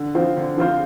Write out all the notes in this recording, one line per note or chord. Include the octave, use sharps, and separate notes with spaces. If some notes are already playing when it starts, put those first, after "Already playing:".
Already playing: D3
F3 C4 F4 C5
D3
F3 C4 F4 C5